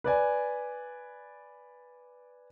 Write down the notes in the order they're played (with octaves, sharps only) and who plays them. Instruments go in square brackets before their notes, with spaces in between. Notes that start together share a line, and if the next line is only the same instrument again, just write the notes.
[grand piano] B4 D5 G#5